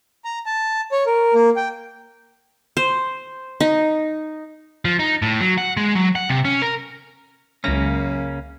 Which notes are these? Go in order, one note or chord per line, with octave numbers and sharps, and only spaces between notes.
A#5
A5
C#5
A#4
A#3
G5
C5
D#4
F3
D#4
A2
F#3
F#5
G#3
F#3
F#5
C3
C#4
A#4
C#2 F#2 C#3 A#3 C#4 A#6